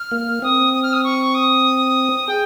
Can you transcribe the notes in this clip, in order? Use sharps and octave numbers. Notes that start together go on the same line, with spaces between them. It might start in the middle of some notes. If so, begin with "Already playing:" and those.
Already playing: F6
A#3
C4 D#6
D#6
F6
D#6
C#6
D#6
G#4 G5